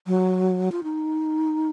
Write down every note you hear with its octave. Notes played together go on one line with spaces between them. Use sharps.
F#3
F4
D#4